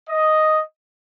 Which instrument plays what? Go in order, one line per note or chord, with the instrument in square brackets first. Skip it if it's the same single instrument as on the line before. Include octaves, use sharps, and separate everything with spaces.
[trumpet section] D#5